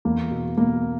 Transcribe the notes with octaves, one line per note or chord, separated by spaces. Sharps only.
E2 A#3
B2
B2 A#3